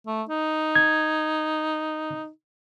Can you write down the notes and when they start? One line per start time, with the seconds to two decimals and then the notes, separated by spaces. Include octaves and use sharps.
0.07 A3
0.29 D#4
0.76 G#6